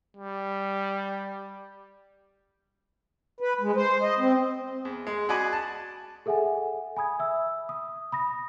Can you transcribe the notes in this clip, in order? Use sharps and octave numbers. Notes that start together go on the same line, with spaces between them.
G3
B4
G#3
C5
D#5
C4
E2
G#3
F#4 G#4 D5 D#5 G#5 B5
A5
G#4 A4 E5 F#5 G#5
G#5 B5 D#6 G#6
E5 E6
D#6
B5 D#6 A#6